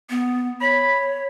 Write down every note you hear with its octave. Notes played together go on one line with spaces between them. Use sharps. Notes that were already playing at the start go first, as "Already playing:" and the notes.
B3
C#5 B5